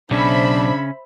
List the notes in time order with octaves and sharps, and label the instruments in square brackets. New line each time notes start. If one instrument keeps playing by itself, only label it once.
[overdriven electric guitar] B1 [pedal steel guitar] C#3 C#4 [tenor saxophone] D4 [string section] C5 E5 B5